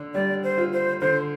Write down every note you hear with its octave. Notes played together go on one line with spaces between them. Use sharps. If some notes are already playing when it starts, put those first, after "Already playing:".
Already playing: D3 D4
G3 D5
C5
F4
C5
D3 C5